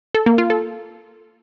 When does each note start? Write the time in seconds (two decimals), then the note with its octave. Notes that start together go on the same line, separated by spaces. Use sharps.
0.14 A4
0.26 A#3
0.38 F4
0.50 A4